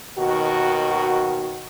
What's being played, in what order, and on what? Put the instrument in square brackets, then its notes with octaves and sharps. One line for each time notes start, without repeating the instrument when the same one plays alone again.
[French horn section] D#2 B2 D#3 F#4